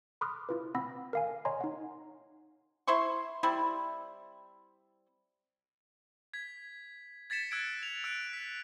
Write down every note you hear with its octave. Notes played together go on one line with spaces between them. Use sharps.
B5 C6 D6 D#6 F6 F#6
E4 F4 B4
C4 F#5 B5 E6 A#6
A#4 F5 G#5
C#5 D#5 G#5 A#5 C6
D#4 F#5
E4 C5 C6 C#6
G3 C4 E4
G#6 B6
G#6 A6 B6 C#7 E7
E6 F#6 G#6 C#7 D7
F7
E6 F#6 D7
B6